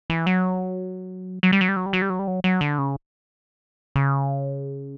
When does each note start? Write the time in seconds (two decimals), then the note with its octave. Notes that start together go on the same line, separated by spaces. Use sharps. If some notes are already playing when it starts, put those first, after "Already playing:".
0.10 E3
0.26 F#3
1.43 F#3
1.52 G3
1.61 F#3
1.69 G3
1.76 F#3
1.86 G3
1.93 F#3
2.02 G3
2.10 F#3
2.19 G3
2.27 F#3
2.44 F#3
2.61 D3
2.78 C#3
3.96 C#3